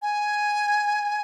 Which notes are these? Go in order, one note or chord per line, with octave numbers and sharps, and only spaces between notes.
G#5